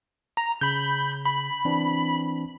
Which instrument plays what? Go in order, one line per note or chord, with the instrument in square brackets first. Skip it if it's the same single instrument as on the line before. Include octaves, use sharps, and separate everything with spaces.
[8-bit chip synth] A#5
[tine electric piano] C#3 [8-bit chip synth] B5 G6
[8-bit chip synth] B5
[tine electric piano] E3 C4 D4